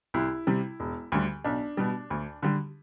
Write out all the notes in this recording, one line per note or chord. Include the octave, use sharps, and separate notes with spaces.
C2 E4
C3 G3
E1
D2 D3 G3
B1 D4
B2 G3
D2
D3 G3